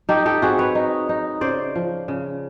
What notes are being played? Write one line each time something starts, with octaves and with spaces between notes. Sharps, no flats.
D#4 G4 A4
G4 A4
C4 F#4 G#4
B4 C#5
D#4
D#4
C#3 C5 D5
F3
C#3